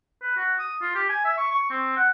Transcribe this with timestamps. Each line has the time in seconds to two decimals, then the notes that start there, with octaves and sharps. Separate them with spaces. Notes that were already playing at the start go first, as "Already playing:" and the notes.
0.22 B4
0.37 F#4
0.59 D#6
0.82 F4
0.95 G4
1.09 G#5
1.25 E5
1.37 C#6
1.51 C#6
1.70 C4
1.97 F#5